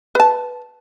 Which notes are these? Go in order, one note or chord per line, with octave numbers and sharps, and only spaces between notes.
B4 A5